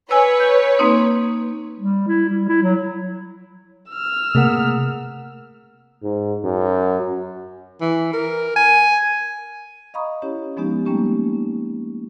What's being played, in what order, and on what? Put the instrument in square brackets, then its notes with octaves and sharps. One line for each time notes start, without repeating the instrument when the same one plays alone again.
[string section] B4 C#5 [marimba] G#5 E6
[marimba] G6
A#3 C4 D#4
[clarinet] G3
E4
G3
E4
F#3
[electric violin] E6 F6
[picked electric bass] C3 A#3 [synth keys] A3 [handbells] G#4 A#4 F#5
[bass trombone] G#2
F#2
[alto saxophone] E3
A#4
G#5
[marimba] D#5 F5 A#5 B5 C#6 D#6
C#4 E4 G4 C#5
F3 G#3 B3 C#4 D#4 G4
G3 A3 A#3 C#4 D#4 G4